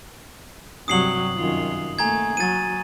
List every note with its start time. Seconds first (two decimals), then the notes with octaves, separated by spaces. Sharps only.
0.88 G2 C3 F#3 D#6 C7 F#7
1.36 F#2 D#3 F4
1.99 A3 A#3 G#5 A#5 G#6
2.37 F#3 A6 D#7